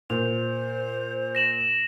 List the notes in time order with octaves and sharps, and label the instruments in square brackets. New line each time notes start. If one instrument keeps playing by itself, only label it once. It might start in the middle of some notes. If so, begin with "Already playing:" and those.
[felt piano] A#2 [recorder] C5 [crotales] F7
[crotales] A#6 E7 F#7